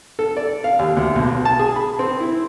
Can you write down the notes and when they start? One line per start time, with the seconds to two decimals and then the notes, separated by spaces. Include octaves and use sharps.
0.19 A4
0.37 D5
0.64 F5
0.79 D#2
0.97 D2
1.16 B1
1.45 A5
1.59 G#4
1.76 B5
1.99 C4
2.20 E4